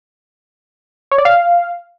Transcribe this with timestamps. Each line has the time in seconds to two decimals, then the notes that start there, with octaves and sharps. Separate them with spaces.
1.12 C#5
1.18 D5
1.25 F5